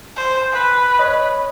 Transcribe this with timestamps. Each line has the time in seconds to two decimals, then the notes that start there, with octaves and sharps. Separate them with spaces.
0.16 C5
0.52 B4
0.98 C#5 D#5 B5